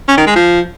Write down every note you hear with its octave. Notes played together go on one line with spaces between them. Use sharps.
C#4
D#3
G#3
F3